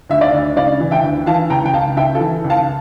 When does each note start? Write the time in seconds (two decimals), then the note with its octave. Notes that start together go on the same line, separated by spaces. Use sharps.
0.09 D2 E5
0.21 D5 F5
0.33 D2
0.56 C#3 D5 F5
0.80 E3
0.91 E5 G5
1.03 D2
1.26 E3 F5 A5
1.50 C#2 G5 A#5
1.65 G5
1.74 C#2 F5 A5
1.97 C#3 E5 G5
2.15 F4 A4
2.20 E3
2.44 C#2
2.50 F5 A5